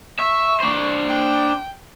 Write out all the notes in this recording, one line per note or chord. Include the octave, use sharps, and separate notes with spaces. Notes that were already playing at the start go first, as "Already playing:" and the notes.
E5 C#6
D4 C5
G5